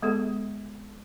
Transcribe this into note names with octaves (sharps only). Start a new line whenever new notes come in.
G#3 B3 G#4 A4